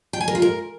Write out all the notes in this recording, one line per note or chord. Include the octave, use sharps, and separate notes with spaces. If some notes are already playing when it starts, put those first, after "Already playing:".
G5
G#5
A#4
F4
A#4